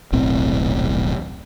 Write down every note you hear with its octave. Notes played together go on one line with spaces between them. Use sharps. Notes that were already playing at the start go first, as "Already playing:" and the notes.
D#1 B1 A2 C4